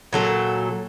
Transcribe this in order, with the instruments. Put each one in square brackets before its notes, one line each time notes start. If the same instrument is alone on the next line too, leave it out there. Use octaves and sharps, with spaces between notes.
[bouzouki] A#2 F#3 A4